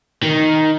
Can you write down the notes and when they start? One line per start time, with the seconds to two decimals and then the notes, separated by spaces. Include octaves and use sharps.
0.23 D#3